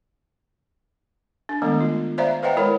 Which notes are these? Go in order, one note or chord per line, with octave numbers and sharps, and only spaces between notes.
D4
D#3 G#3 A3 B3
F4
C5 D5 E5 F5 A#5
B4 C5 D#5 F#5 G5 A#5
G#3 E4 A#4 C#5 B5